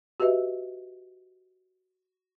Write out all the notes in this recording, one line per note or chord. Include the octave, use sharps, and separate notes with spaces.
F#4 G4 B4 D#5 E5